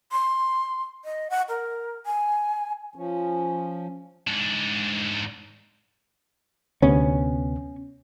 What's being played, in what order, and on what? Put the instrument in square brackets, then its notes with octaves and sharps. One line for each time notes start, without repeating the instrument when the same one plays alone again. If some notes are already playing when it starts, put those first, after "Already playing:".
[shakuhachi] C6
D#5
F#5
A#4
G#5
[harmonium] F3 C#4
[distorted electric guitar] G#2 D4
[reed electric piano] D2 C3 B3 [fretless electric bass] C#4